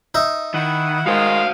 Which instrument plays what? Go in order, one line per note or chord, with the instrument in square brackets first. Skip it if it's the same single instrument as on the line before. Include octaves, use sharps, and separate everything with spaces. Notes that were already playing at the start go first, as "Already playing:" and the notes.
[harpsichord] D#4 E5
[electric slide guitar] D#3 [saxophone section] E4 F#5
[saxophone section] D#3 G#3 [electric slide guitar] F#4 C5 [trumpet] F5